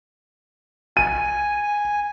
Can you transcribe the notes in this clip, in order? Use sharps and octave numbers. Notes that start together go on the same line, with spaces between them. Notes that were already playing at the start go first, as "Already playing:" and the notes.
G#5 D#7